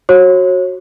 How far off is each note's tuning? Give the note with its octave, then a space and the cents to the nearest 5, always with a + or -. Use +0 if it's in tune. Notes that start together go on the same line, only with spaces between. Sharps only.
F#4 +0 C#5 -35